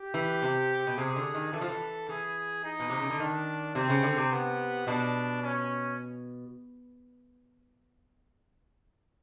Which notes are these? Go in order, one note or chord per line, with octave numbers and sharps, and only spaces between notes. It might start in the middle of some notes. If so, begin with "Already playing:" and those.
Already playing: G4
E3
C3
B2
C3 G#4
D3
D#3
E3 A4
F3
E3
E3 G#4
D#4
B2
C3
C#3
D3
D#3 D4
C3 C4
C#3
D3
C3
B3
B2 D4
C#4